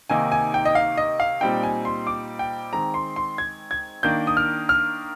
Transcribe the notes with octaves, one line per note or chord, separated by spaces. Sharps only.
C3 D#3 A#3 D#4 G#5
G#5
G5
D#5
F5
D#5
F5
A#2 G3 C4 D#4 G5
G#5
C6
D6
G5
D#3 G#3 C4 A#5
C6
C6
G#6
G#6
D#3 A#3 D4 G6
D#6
F6
F6